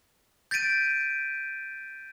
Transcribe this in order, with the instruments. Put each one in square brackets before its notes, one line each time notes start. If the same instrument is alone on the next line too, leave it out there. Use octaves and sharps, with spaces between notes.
[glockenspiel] G6 A6 B6 D7 D#7